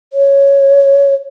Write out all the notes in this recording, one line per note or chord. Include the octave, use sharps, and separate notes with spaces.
C#5